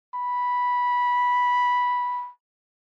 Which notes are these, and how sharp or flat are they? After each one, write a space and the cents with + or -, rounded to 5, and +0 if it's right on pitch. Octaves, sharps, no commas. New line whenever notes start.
B5 -10